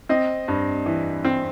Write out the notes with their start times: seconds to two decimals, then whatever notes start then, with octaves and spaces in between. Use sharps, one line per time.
0.09 C4 D#5
0.48 G2
0.86 E3
1.24 C4